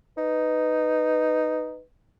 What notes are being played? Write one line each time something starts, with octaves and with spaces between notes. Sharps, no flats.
D#4 B4